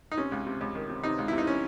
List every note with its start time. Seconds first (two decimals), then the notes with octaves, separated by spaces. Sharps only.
0.12 D#4
0.17 C3 C#4
0.32 C#2
0.46 C3
0.61 C#2
0.75 D#3
0.89 C3
1.03 C3 D#4
1.18 C#2
1.28 E4
1.33 C3
1.38 D#4
1.47 C#4